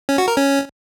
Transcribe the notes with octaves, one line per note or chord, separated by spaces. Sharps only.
C#4
F#4
A#4
C#4